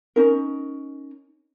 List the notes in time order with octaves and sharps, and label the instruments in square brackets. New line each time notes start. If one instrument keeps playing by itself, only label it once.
[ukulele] C#4 D#4 A#4